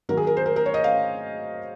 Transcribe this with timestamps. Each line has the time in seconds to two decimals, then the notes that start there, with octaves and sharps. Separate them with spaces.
0.09 D#3 F#3 A#3 A#4
0.17 G#4
0.27 A#4
0.37 C5
0.46 A#4
0.56 A#4
0.66 C#5
0.74 D#5
0.84 F5